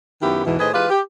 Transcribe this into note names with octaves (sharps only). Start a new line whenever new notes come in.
F#2 D#3 B3 E4 G4
E2 G#2 B2 E3
A2 D#3 G#4 B4 C5 D#5
E3 G#3 F4 G4 B4
G4